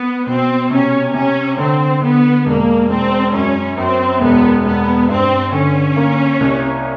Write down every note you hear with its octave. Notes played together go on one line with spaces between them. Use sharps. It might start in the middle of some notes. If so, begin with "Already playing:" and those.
Already playing: B3
B2 C4
C3 C#4
C3 C#4
D3 C4
D3 B3
E1 A#3
E1 C4
F#2 C#4
F#2 C4
E1 B3
E1 B3
G2 C4
D3 C#4
A#3
C2